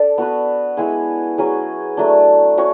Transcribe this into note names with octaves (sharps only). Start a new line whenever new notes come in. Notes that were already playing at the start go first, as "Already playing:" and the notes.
Already playing: D4 A4 D5
B3 F#4 B4
G#3 B3 E4 G#4
F#3 C#4 G#4
F#3 A3 D4
C#4 F#4 C#5